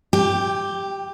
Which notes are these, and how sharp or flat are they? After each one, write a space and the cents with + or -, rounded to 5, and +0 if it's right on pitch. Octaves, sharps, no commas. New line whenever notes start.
G4 +0 G5 +30